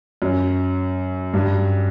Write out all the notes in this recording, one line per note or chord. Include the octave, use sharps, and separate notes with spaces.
F#2
G2